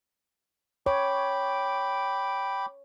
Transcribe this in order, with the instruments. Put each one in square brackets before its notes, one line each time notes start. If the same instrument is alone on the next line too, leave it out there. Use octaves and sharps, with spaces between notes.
[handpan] C#5 [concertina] G5 B5 D6